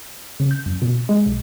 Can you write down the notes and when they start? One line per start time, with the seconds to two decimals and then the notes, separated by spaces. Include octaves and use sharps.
0.40 C#3
0.51 G6
0.66 F#2
0.82 B2
1.09 G#3
1.26 B1